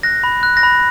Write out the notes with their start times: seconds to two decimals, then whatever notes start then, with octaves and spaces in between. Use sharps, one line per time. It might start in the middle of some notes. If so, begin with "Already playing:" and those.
0.03 F#6 A#6
0.24 B5
0.43 F#6
0.57 A#6
0.63 B5